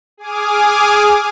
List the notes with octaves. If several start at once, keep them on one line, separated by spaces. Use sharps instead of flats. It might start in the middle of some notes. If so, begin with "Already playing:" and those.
G#4 G#5 D6 D#6 F6